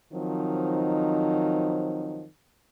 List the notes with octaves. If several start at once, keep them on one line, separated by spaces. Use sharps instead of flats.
D#3 F3 F#3 C4 D#4